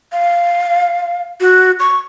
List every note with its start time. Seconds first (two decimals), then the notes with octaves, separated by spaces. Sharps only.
0.12 F5
1.41 F#4
1.80 C#6